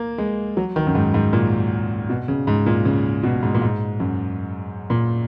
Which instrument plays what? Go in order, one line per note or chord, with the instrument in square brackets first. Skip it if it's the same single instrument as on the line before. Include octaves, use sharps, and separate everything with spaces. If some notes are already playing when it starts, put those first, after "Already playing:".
Already playing: [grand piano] A#3
G#3
F#3
D#3
F#2
G#2
G#2
A#2
B2
C#3
G#2
A#2
C#3
B2
G#2
A#2
G#2
F#2
A#2